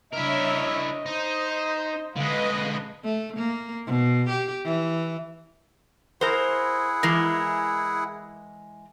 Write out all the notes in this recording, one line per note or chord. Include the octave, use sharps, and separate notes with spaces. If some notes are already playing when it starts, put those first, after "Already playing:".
D4 E4 A#4 C#5 D#5 E5
D#4 C5
D3 G#3 B4 D#5 F5
A3
A#3
B2
G4
E3
E4 G#4 A#4 C5 F#5
E3 G#3 A#4